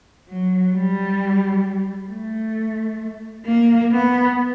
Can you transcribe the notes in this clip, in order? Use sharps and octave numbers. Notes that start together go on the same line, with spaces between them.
F#3
G3
A3
A#3
B3